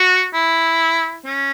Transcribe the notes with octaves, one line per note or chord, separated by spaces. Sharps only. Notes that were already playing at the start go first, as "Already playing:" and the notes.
Already playing: F#4
E4
C#4